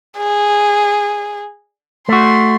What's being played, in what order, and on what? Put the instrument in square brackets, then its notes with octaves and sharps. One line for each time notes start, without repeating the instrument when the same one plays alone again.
[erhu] G#4
[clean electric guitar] A3 F#4 [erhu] C6